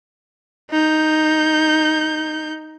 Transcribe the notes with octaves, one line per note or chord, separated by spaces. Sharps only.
D#4 G6